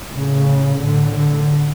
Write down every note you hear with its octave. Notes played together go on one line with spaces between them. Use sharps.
A2 C#3
A2 D3
D3